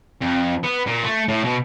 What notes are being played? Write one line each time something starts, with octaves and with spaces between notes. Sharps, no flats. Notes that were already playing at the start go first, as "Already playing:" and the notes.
F2
B3
A#2
A3
A2
B2